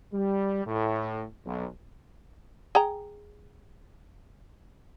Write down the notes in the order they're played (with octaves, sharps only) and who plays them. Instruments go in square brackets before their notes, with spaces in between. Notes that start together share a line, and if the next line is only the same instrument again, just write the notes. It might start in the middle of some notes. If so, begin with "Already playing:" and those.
[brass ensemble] G3
A2
B1
[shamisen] G#4 G5 A#5